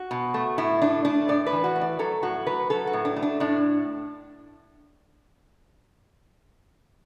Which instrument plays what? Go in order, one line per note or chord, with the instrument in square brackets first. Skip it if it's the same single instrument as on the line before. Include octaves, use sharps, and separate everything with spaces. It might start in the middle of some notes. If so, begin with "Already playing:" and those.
Already playing: [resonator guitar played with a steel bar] F#4
B2
A3
A2 E4
A3 D4
A3 D4
A2 D5
B4
E3
F#4
A3
D5
F#3 A4
A2 F#4
F#3 B4
F#3 A4
F#4
A2
D4
A3
D4
A2 D4